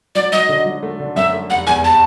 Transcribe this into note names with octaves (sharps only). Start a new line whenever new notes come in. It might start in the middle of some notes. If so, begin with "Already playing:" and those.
F#3 D5
F#3 D#5
D3
F#3
A3
D3
F#2 E5
A3
F1 F#5
E2 G#5
A5